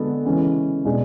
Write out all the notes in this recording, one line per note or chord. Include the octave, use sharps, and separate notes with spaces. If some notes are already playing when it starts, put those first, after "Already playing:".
Already playing: D3 G#3 B3 F#4 A4
C#3 E3 G#3 C#4
B2 G#3 D4 G#4